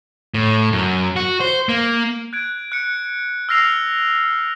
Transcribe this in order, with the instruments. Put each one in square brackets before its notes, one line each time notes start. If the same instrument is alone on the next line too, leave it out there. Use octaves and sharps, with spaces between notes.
[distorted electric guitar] A2
F#2
F#4
C5
A#3
[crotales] F#6 G#6 D7
F#6 C#7
E6 F6 A#6 C7 F7